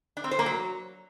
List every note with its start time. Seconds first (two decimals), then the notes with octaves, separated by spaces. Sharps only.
0.17 D4
0.24 C4
0.31 C5
0.39 A#3
0.46 F#3